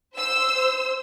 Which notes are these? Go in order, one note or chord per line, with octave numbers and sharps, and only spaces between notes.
C5 E6